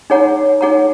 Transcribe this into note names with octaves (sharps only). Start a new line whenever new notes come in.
D#4 G#4 C#5 F#5 A#5
D#4 G#4 C#5 F#5 A#5